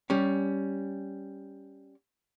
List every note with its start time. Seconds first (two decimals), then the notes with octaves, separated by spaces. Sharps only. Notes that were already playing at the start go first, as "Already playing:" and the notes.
0.10 G3 C#4